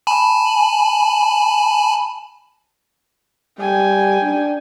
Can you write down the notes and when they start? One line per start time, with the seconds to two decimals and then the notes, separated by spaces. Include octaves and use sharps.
0.07 G#5 A5 B5
3.59 G3 G5 G#5
4.22 D4